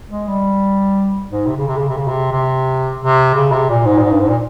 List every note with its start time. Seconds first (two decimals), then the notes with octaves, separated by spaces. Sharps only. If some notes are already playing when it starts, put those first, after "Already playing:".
0.10 G#3
0.27 G3
1.30 G#2
1.47 C3
1.57 C#3
1.68 C3
1.78 C#3
1.88 C3
1.97 C#3
2.07 C3
2.32 C3
3.01 C3
3.34 C#3
3.52 C3
3.69 A#2
3.86 G#2
3.98 A#2
4.03 G#2
4.11 G2
4.20 G#2
4.29 A#2